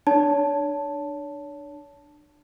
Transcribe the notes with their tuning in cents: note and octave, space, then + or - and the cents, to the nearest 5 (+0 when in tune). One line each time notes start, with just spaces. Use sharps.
D4 +25 C#5 +35 A5 +0